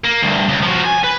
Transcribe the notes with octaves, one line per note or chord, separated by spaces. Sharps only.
A#3
D2 G2
C#2
F3 F#4
G#5
B4